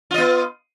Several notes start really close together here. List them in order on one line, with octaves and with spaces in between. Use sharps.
F4 D#5 B3